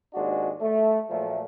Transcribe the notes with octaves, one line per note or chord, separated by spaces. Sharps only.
G#1 D#2 G#3 D4 F#4
A3
A#2 F3 F#3 A3